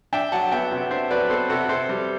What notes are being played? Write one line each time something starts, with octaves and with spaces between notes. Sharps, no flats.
D4 E5 G5
F#3 F#5 A5
B3 E5 G5
C3
D4 C5 E5
F#3 B4 D5
B3 A4 C5
C3 F#4 A4
C3 A4 C5
G3